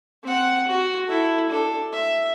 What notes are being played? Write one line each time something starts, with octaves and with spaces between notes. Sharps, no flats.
C4 F#5
F#4
E4 A4
D4 A4
E5